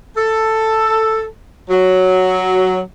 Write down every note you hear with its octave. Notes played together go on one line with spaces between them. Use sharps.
A4
F#3